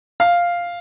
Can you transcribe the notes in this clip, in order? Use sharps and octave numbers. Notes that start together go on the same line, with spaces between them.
F5